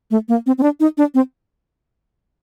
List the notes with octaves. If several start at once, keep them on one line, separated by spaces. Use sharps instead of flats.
A3
A#3
C4
C4
D4
D#4
D4
C4